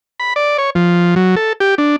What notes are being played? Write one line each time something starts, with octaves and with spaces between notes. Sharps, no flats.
B5
D5
C#5
F3
F#3
A4
G4
D4